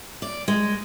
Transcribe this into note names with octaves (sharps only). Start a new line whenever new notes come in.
D5
G#3